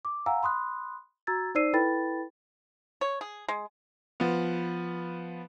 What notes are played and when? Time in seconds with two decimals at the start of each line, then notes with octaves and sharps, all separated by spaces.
0.05 D6
0.26 F5 F#5 G#5 A#5 E6
0.43 B5 C6 D#6 F#6
1.27 F#4 A#5 E6 G#6 A6
1.55 D#4 C5 D5 E6 C7 D#7
1.73 E4 A4 B4 G5 B5 A6
3.01 C#5
3.21 G#4
3.48 G#3
4.20 F3 B3